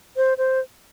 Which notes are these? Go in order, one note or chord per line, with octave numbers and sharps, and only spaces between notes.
C5
C5